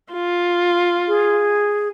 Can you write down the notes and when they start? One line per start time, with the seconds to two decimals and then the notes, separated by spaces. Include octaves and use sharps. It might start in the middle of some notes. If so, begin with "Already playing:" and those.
0.13 F4
1.08 G#4